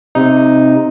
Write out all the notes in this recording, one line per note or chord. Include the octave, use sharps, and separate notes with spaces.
C3 D#4